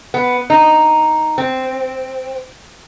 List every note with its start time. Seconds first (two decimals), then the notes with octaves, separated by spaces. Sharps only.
0.14 B3
0.50 D#4
1.38 C4